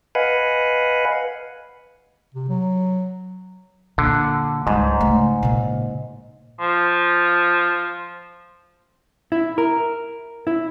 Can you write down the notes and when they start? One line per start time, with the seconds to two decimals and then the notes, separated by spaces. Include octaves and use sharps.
0.15 B4 D#5 F5 F#5 G#5 B5
2.35 C3
2.49 F#3
3.98 A#2 D3
4.67 C#2 G#2 G3
5.01 C#3 A3
5.43 A#2 C#3
6.60 F3
9.32 E4
9.58 A#4
10.47 E4